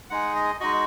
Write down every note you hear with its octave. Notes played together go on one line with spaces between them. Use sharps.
G#3 D#4 G#4 F#5
D#5
G#3 D#4 F#4 D#5